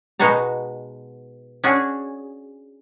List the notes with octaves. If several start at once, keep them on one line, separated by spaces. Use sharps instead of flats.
B2 G#3 B3 D#4 F#4 A#5
C#4 D4 F#4 G#4